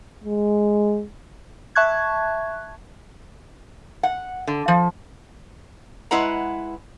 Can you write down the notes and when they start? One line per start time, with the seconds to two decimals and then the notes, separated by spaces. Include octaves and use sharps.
0.24 G#3
1.75 E5 A5 C#6 F#6 G#6
4.03 F#5
4.47 D3
4.68 F3
6.11 G#3 E4 B4 F#5 A#5